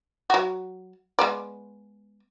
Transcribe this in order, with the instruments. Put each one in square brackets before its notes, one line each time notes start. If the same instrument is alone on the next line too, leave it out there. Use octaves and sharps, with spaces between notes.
[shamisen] F#3 F#4
G#3 B3 D5